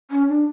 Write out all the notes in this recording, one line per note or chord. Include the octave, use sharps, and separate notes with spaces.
C#4
D4